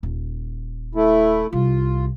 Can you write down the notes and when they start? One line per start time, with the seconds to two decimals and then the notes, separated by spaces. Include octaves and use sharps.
0.03 D#1
0.95 A3 E4
1.53 C2 F4